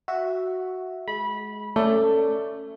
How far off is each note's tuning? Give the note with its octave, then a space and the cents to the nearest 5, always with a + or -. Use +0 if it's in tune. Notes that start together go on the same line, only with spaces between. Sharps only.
F#4 +0 E5 +0
G#3 +20 B5 -20
A3 +15 C#4 +0 D5 +0